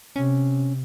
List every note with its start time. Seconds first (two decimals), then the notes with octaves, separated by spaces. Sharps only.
0.16 C3 C#4